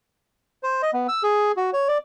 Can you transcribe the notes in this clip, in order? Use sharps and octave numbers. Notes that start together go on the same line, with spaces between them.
C5
D#5
B3
E6
G#4
F#4
C#5
D5